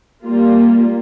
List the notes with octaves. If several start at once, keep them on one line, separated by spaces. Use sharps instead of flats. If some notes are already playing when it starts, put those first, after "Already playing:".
G3 A#3 F4